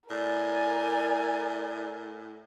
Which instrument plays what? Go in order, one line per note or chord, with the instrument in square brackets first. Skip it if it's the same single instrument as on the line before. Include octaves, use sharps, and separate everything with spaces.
[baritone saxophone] A2 [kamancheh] A#4 G#5 [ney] D5